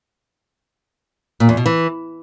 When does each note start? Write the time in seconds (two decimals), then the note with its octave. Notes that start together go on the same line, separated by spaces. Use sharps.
1.40 A#2
1.49 E2
1.57 B2
1.66 E3